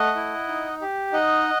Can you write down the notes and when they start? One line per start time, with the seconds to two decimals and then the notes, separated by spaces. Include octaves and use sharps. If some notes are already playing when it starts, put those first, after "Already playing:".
Already playing: A3 D#5 F#5
0.16 E4
0.48 D#4
0.81 G4
1.13 D#4 D#5 F#5